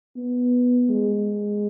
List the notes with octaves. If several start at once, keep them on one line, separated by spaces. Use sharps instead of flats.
B3
G#3